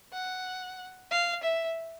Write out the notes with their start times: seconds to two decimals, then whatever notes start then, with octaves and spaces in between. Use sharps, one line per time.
0.13 F#5
1.11 F5
1.44 E5